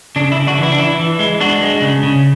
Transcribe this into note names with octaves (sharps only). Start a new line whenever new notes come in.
C#3 D4
E4
C#3
D4 F#4
E3
E4
D4
E3 E4
E3
G#3
G#3 D4 F#4
G#3
C#3
C#3